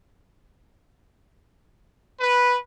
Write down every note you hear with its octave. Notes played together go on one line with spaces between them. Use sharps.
B4